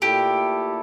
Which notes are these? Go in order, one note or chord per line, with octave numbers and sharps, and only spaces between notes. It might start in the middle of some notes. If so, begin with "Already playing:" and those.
A#2 A3 E4 G4 A4